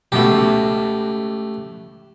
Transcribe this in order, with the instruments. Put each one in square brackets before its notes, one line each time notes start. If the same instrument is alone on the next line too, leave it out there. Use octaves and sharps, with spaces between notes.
[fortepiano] C#2 B2 [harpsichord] A3 G4